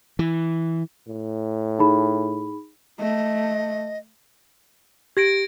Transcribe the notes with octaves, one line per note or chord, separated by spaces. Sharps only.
E3
A2
D#4 G#4 B5
A3 D#5
G4 G#6 A#6 D7